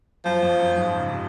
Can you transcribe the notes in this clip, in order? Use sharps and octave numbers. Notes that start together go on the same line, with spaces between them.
F#2 F3
F2
F#2
F#2
G#2
C#3
C3